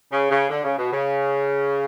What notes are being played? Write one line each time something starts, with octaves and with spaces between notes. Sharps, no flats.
C#3
C#3
D3
C#3
B2
C#3